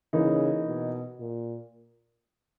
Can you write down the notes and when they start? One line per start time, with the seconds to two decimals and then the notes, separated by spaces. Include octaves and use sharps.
0.13 C#3 E3 A#3 D#4
0.67 B2
1.20 A#2